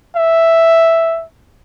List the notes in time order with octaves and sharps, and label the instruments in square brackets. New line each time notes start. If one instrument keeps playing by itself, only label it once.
[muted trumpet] E5